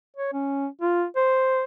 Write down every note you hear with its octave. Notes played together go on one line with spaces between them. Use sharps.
C#5
C#4
F4
C5